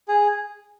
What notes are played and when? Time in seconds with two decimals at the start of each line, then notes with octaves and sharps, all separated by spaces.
0.08 G#4